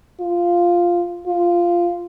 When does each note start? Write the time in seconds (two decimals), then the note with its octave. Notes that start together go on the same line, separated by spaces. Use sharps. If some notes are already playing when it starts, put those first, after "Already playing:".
0.20 F4
1.27 F4